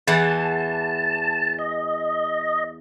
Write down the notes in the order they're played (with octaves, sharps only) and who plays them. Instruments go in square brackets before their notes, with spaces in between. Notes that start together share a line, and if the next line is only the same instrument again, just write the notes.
[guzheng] E2 E3 F#5 [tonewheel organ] A5
[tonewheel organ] D#5